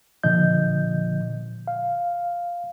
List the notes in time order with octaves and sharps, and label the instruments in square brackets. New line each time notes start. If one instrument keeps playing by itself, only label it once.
[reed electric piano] A#2 D3 F3 D#5 G6
F5